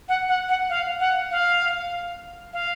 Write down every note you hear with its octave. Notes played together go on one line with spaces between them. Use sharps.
F#5
F#5
F#5
F5
F#5
F5
F5